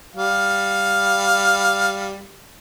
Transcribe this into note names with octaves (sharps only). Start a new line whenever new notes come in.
G3 F5